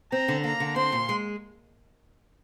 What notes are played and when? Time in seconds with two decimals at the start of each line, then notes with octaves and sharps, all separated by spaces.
0.12 C4 A#5
0.28 D3
0.44 A#3 A#5
0.60 D3
0.76 C4 C6
0.92 A#2
1.09 G#3